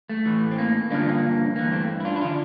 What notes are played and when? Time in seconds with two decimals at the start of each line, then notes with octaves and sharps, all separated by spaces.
0.09 A3
0.26 A2 E3
0.51 C4
0.58 A#3
0.91 G2 D3 F3 A#3 D4
1.01 A3
1.08 A#3
1.56 G2 E3 A#3
1.72 A3 C4
2.00 E4
2.05 D4 F4
2.16 E4
2.21 D3 F3 D4 F4